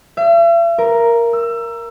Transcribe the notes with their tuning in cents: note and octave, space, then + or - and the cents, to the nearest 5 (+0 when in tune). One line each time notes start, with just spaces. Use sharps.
E5 +45
A#4 +5
E6 +25